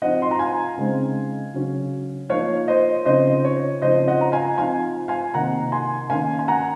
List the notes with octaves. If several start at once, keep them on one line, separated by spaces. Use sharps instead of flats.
F3 C4 D#4 D#5 F#5
C6
A#5
F5 G#5
C#3 G#3 C4 D#4
C#3 F#3 C#4
F3 A#3 D#4 C#5 F5
C5 D#5
C#3 F3 C4 D#4 C5 D#5
C#5
C#3 F3 C4 D#4 C5 D#5
D#5 F#5
A#5
F5 G#5
F3 C4 D#4 F5 G#5
F5 G#5
C3 D#3 A#3 D#4 F#5 A#5
G#5 C6
D#3 A#3 C#4 F5 G#5
G#5
F#5 A#5